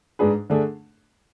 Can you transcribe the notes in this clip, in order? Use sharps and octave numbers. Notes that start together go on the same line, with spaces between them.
G#2 G#3 D4 G#4 B4
D3 A3 D4 G#4